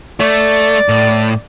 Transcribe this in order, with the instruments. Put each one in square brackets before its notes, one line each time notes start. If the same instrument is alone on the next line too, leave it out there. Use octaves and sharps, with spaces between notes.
[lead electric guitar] A3 [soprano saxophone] D5
[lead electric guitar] A2